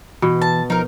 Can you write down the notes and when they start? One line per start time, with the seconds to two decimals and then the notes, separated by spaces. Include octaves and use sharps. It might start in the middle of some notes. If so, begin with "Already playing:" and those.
0.22 B2 E3
0.42 A5
0.70 F3 D#4 A#4